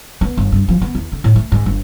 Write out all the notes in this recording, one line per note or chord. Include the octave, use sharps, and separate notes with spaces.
B3
G1
G2
F3
B3
E2
D3
A2
A3
G#2
G1